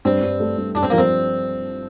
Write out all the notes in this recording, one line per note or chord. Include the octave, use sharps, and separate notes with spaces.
G2 C4
G2
A3
G2
G2 D4
C4
F3 A#3
C4